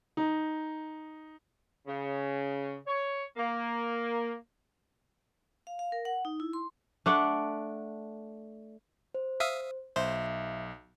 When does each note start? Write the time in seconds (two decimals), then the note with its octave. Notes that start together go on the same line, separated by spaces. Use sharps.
0.17 D#4
1.87 C#3
2.87 C#5
3.37 A#3
5.67 F5
5.79 F5
5.92 A#4
6.05 F#5
6.25 D#4
6.40 E4
6.53 C6
7.06 A3 D4 D5 F#5
9.15 C5
9.40 E5 F5 D#6
9.96 B1 C5 E5